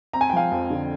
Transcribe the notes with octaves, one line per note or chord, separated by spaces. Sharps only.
C4 A#5
G#5
G5
F3 F5 G#5
F2
D3